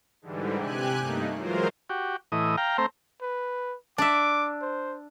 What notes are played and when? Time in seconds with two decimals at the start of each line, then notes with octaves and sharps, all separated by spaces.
0.21 G#2 D3 E3 G3
0.57 C3 G4 G#5 F#6
1.00 G2 A3 A#3 D#4
1.36 E3 F#3 G#3 F4 A#4 C5
1.89 F#4 G4
2.32 A2 E3 D#5
2.57 F5 G5 A#5
2.78 A3 C4 C5 A#5
3.22 B4
3.98 D4 E5 D6
4.62 C5